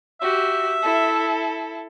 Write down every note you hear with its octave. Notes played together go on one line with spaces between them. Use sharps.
F#4 G4 E5
E4 A4